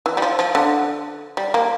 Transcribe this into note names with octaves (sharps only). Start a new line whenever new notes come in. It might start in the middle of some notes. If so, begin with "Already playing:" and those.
E3
G3
F3
F3
D3
G3
A#3